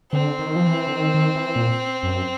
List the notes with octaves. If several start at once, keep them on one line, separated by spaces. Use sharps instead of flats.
D3 C4
D#3
F3
E3
D3
D#3
D#3
E3
A#2
F#2